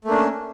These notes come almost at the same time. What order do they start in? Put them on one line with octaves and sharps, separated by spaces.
A3 A#3 D4 C#4